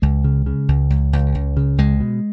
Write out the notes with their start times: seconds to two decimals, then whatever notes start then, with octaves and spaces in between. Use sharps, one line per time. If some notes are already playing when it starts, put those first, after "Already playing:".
0.02 C#2 G#3
0.24 C#3
0.46 C#3
0.68 C#2
0.90 C#2
1.13 C#2
1.35 C#2
1.57 C#3
1.78 C#2 G#3
2.00 B2